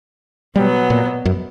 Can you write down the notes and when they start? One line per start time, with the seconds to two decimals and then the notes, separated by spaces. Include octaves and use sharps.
0.56 B2 F#3 G3 B3
0.90 A#2
1.25 F#2